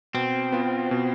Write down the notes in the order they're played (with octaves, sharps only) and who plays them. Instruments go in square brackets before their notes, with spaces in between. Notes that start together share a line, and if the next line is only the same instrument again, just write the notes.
[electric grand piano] B2 [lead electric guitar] C4
[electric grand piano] B3 F4
B2